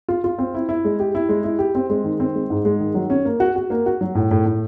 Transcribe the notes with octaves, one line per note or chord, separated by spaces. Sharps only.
F4
F4
C4
E4
E4
G#3
G4
E4
G#3
E4
G4
C4
G#3
D#3
C4
G#3
G#2
G#3
D#3
F#3
C#4
A#3
F#4
F#4
A#3
F#4
F#3
A2
A2
A2